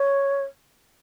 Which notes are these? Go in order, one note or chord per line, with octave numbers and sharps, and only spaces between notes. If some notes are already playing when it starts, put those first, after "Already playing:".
Already playing: C#5